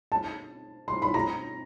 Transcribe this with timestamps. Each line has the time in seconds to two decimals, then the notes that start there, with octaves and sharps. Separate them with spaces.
0.12 A5
0.88 C6
1.02 B5
1.14 A#5